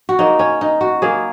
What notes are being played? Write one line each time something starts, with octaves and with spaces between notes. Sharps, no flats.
F#4
C#3 F#3 A#3 D#4
C#4
D#4
F#4
C#3 F#3 A#3 G#4